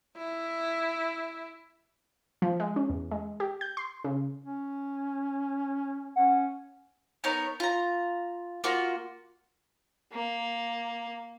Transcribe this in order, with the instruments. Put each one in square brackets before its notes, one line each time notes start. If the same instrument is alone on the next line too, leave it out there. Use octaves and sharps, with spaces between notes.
[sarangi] E4
[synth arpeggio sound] F3
G#3
C#4
E2
G#3
G4
G6
C6
C#3
[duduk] C#4
[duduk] C#4 [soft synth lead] F#5
[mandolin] B3 D#4 A#4 C#5
F4 A#5
A#3 F4 F#4
[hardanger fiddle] A#3